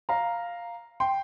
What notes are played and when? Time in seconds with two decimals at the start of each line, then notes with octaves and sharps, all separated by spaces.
0.09 F5 A#5
1.00 G5 C6